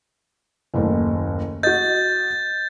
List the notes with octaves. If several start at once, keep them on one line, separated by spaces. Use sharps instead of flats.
F#1 D#2 A2
F#4 D#5 G6 A6